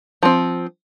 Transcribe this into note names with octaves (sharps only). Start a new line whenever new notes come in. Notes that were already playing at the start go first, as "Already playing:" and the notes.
F3 C4